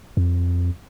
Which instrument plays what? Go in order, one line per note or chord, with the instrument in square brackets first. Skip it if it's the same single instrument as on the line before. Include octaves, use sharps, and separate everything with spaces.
[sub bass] F2